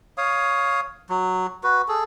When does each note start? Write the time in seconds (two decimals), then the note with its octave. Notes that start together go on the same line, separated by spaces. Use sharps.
0.18 C#5 F5 D#6
1.10 F#3
1.63 F#4 B4
1.88 G#4 A4